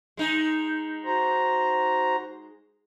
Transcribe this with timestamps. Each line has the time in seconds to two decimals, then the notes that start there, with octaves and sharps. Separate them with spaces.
0.17 G#3 D#4
1.05 F#4 C5 A#5